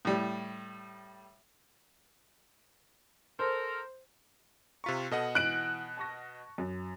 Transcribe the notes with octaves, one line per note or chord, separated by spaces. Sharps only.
A2 G3
A4 A#4 C5
C3 F4 A#5 C#6 B6
B2 A4 D#5 F#5
E3 F#6 D7
A5 C#6 A#6
F#2